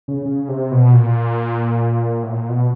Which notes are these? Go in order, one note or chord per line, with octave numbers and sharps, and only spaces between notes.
C#3
C#3
C3
B2
A#2
A2
A#2
B2